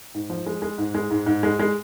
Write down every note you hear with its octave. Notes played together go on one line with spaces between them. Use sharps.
G#2
F3
G#3
G#3
G#2
G#3
G#2
G#2
G#3
G#3